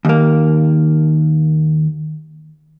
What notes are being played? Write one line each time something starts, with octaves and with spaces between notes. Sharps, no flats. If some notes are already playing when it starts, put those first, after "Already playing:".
D#2 A#3